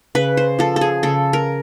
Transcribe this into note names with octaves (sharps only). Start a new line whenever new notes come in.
C#3 B4
C5
F3 A4
A4
G#4
C#3 A4
A#4